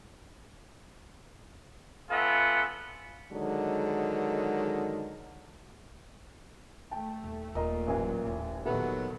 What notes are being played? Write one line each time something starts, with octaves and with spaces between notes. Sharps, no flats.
B3 C#4 F4 A4 E5 F#5
D3 D#3 F#3 G#3
A3 G5 A5
D#1
D#1 A#2 A#4 D#5 A#5
A1 F#3 A#4 G#5
D#1 A2
A#2 D#3 F#3 B3 G4 A4 E5